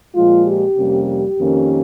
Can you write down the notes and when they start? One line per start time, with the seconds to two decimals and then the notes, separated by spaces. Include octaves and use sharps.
0.15 A#2 F3 G#3 F4
0.46 G4
0.77 F2 C3 G3 A#3 C#4
1.07 G4
1.38 F2 D#3 A#3 C#4